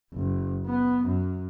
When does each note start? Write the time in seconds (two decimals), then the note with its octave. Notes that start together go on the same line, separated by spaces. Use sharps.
0.12 F#1
0.66 B3
1.04 F#2